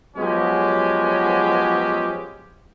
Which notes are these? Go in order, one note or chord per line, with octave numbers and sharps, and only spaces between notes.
F3 F#3 G#3 B3 C#4 G4